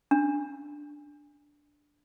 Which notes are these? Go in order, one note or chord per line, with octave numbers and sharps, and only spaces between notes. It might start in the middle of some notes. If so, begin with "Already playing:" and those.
D4